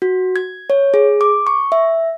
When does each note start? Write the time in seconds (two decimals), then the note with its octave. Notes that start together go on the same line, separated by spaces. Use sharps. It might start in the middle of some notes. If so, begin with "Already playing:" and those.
0.02 F#4
0.36 G#6
0.70 C#5
0.94 G#4
1.21 D6
1.47 C#6
1.72 E5